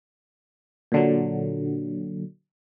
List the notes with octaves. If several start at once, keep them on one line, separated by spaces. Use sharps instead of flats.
A#2 D3 F#3